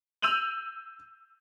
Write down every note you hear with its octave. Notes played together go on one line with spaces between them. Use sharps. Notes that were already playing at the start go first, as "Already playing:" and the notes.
E6 G6 D#7 F7 F#7